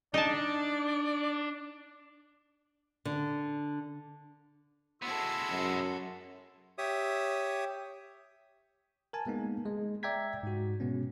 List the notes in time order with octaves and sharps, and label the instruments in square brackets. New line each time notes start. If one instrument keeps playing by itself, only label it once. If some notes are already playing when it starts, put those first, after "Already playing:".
[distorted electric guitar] D4 [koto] D#4 A5 [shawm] D5
[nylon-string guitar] D3
[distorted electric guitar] G#3 B3 [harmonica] E4 C6 E6 [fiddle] F#4 A4
[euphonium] F#2
[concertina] G4 C#5 E5 D#6
[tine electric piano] A#4 G#5 A5
G#3 A#3 B3 D#4
G#3
D5 E5 G5 A#5 G#6 B6
G#2 F#4
B2 G#3 B3 C#4